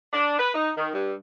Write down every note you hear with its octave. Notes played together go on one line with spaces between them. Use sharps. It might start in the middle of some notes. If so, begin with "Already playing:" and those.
D4
B4
D#4
D#3
G2